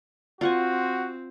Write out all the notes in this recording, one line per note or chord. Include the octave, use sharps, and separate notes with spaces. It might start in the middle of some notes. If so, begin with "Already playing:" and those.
C4 F4 F#4 F#5 G#5